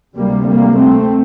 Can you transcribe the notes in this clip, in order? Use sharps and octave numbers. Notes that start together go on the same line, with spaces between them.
D2 C3 G3 A#3
G3 A#3
A3 C4